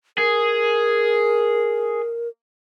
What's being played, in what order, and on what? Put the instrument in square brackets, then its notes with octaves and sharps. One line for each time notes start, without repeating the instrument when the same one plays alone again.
[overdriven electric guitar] G#4 [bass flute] A#4